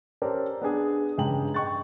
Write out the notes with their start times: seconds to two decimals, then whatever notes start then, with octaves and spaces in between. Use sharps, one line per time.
0.22 C#4 G4 A4 A#4 C5 D5
0.61 B3 D4 G#4
1.18 G2 C#3 G#3 G5 A#5 F#7
1.54 D#5 G5 C#6 F#6 A6